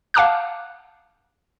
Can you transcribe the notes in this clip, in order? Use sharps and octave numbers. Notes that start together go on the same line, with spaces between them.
F5 F#5 A5 D6 F6 F#6